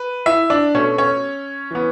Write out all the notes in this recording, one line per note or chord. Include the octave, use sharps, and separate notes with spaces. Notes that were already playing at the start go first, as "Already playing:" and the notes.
Already playing: B4
E4 E5
D4 D5
B2 A3 C#4 C#5
C#4 C#5
E3 B3